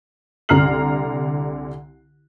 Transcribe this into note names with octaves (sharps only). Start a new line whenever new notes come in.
C2 D3 A#5 F6 C7 F#7